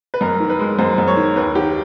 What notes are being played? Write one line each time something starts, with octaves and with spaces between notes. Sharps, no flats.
B4
F#2 A#4
D#3
B4
G#3
F#2 C5
F#2
C#5
D#3
D#2 B4
D#3 G4